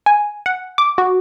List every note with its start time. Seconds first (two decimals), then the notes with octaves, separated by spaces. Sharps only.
0.06 G#5
0.46 F#5
0.78 D6
0.98 F#4